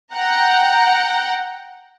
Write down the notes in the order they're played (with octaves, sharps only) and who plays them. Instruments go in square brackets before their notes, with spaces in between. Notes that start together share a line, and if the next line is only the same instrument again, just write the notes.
[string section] F#5 G5 A#5